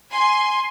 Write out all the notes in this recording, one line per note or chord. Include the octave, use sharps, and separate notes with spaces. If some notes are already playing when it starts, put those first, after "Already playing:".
G#5 C6